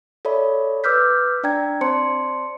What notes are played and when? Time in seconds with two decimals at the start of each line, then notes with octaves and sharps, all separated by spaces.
0.25 A4 C#5 D5 E5 B5
0.84 B4 D6 E6 F6 G6 B6
1.43 D4 D5 G5 A#5 G#6
1.81 C4 C5 D5 A5 C6 C#7